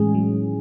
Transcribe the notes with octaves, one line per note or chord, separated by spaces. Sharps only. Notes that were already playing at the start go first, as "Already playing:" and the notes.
Already playing: A2 D#3 E3 G#3 C#4 G#4
F#3